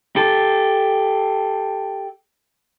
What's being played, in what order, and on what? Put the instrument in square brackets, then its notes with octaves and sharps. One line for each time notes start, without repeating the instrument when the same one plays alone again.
[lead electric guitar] G4 A4